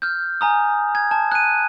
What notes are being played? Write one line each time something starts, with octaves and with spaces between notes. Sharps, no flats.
F6 G6
G#5 A#5 D#6
G#6
A5
F#6 D#7